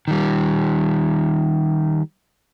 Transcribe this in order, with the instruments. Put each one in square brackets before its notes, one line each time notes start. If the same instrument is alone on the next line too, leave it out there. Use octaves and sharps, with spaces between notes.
[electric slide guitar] D#3 G3